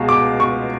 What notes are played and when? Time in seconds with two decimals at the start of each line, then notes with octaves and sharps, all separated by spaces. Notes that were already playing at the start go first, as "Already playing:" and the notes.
Already playing: C#2 B2 G#3
0.09 D6
0.40 C#6